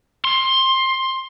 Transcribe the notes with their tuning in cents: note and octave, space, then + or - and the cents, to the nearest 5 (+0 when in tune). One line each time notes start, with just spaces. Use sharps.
C6 +15